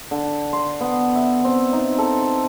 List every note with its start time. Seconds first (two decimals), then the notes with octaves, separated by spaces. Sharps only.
0.11 D3
0.53 C6
0.81 B3
1.15 E5
1.44 C4
1.73 D#4
1.98 A4